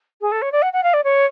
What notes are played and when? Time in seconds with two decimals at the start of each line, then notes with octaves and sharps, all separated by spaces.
0.21 G#4
0.32 A4
0.42 C#5
0.52 D5
0.62 F#5
0.73 F#5
0.83 F5
0.94 D5
1.04 C#5